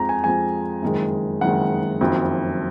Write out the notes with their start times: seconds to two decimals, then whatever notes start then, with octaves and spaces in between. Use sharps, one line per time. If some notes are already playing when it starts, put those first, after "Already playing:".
Already playing: F2 F3 G#3 A#5
0.09 G#5
0.23 F2 F3 G#3 G#5
0.82 F#1 F2 D#3 G#3
1.41 F#1 F2 D#3 G#3 F#5
2.01 F#1 F2 D#3 F#3